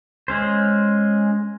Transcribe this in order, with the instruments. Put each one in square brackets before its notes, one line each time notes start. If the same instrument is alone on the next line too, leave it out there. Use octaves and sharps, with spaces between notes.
[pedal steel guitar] G#3 C#4 C5